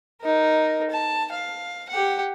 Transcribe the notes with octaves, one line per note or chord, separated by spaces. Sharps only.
D#4 A#4
A5
F5
G4 F#5